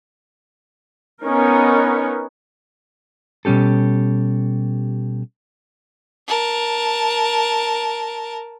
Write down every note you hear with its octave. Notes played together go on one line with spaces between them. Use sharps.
B3 C#4 D#4 A#4
B2 G3 C#4 G4 A4
A#4 A5